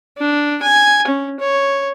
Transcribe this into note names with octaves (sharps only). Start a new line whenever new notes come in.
D4
G#5
C#4
C#5